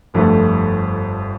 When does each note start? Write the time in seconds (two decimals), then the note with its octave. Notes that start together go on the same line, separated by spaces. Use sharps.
0.14 G1 F2 D3 A3